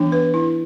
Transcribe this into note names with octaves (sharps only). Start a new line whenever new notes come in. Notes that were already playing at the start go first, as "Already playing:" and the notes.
Already playing: E3 B3 D4
B4
E4